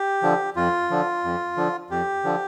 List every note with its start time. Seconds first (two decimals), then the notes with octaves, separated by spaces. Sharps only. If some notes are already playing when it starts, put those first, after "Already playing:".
Already playing: G4
0.22 D3 F3
0.56 F2 F4
0.90 D3 F3
1.24 F2
1.56 D3 F3
1.90 F2 G4
2.24 D3 F3